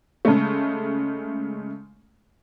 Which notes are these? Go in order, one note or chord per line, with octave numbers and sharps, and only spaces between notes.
C#3 G#3 A3